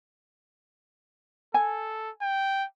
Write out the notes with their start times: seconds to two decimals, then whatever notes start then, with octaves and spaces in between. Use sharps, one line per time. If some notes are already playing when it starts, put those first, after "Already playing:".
1.54 A4 G#5
2.22 G5